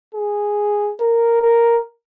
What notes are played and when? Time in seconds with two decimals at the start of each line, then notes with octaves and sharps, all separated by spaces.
0.15 G#4
1.00 A#4
1.42 A#4